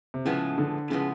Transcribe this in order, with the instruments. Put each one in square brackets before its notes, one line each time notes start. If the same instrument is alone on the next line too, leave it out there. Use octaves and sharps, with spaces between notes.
[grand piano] C3
[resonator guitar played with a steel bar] A2 F3 G#3 B3 [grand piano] C#3
[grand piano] D3
[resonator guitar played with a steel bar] A2 F3 G#3 B3 [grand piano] C#3